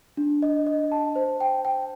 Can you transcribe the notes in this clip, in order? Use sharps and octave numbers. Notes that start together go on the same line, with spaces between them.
D4
D#5
D#5
A5
C5
G5
G5